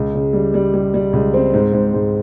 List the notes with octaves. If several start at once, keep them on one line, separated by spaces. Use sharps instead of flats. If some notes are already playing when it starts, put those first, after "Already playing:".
Already playing: C#2
C#3
G3
G3
G3
G3
C#2
C4
G#2
G#2
G#2